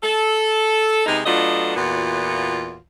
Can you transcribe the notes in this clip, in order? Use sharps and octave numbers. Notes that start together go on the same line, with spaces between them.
A4
C3 G#3 B3 D#4
F#3 A3 B3 D4 F4 D#5
E2 A#2 B3 F4 F#4